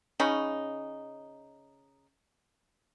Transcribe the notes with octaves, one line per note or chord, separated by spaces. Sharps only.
C#3 C#4 D#4 B5